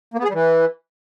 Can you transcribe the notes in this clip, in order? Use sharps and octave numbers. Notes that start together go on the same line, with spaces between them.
A#3
B3
G#4
G3
E3